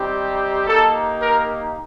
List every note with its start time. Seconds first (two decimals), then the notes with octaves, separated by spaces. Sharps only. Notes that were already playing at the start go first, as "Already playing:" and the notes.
Already playing: G3 C4 D#4 G4
0.67 A#3 D#4 G4 A4
1.20 A#4